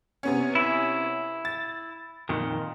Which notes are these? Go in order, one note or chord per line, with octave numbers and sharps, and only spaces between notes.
C3 B3 C#4
E4
A6
F2 A#2 D#3